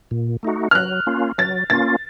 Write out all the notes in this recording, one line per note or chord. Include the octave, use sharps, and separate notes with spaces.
A#2
A3 D#4 F#4
F6
F#3 F#6
A#3 C#4 F4
F#3 A6
A#3 C#4 F4 A6